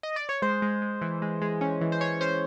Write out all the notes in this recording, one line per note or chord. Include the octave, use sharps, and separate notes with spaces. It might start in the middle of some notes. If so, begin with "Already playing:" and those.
D#5
D5
C#5
G#3 C5
G#3
G#3
E3
G#3
G#3
C#4
E3
C5
C#4 C#5
C#4 C5